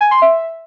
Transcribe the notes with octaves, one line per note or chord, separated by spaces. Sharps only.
G#5
C6
E5